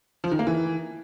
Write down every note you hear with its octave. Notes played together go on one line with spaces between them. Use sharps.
F3
D#3
A#3
E3